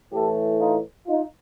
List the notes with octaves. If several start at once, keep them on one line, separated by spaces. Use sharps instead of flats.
A2 E3 A3 G4 A4
D#4 F4
D#4 F4